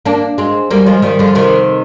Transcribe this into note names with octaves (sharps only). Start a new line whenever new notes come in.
A#3 D4
G#3 C4
G3 A#3
F3 G#3
D#3 G3
D3 F3
C3 D#3